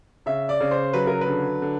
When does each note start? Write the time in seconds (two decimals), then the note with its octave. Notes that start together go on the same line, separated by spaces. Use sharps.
0.26 C#3 E5
0.49 D5
0.60 C#3
0.71 C5
0.93 F#3 B4
1.07 A#4
1.21 B4
1.27 D3
1.62 D3